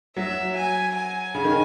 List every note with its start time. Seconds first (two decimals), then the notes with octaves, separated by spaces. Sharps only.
0.16 F#3 E5
0.56 G#5
0.95 G#5
1.35 C#3
1.44 D#3